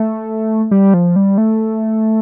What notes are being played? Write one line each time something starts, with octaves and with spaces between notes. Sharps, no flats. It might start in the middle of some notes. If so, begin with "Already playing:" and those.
Already playing: A3
G3
F3
G3
A3